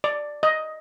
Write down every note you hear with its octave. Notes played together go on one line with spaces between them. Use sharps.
D5
D#5